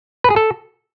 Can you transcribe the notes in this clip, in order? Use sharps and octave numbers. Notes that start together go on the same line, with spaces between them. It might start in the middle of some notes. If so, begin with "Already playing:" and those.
B4
G#4
A4